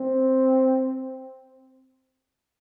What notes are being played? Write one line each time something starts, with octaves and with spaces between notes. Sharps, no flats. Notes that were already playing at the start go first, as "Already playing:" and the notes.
Already playing: C4